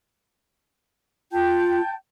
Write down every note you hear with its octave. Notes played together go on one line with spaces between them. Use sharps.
F4 G5 A5 G6